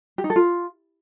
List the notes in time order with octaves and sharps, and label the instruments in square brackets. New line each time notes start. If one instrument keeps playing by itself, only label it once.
[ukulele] G4
D#4
A4
F4